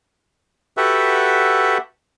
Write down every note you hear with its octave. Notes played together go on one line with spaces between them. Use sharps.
F#4 G4 A4 B4 E5 F#5